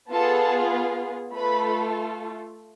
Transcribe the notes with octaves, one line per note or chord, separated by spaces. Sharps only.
B3 F4 G#4 A4 A5
A3 F4 A4 B4 B5